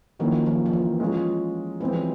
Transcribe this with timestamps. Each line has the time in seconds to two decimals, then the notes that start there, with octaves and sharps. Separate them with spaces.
0.19 D#3 F3 F#3 A#3 C#4 E4
0.46 F3
0.66 F3
0.73 E3
1.00 G#3 C#4 F4 G#4
1.80 E3 F3 G#3 C4
1.93 F#3